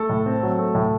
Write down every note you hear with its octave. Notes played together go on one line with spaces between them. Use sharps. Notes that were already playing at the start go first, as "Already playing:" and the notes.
Already playing: A3 A4
A2
C4
F#3
A3
A2